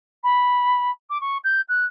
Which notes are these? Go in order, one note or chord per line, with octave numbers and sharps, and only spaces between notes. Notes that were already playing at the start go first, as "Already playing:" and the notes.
B5
D6
C#6
G6
F#6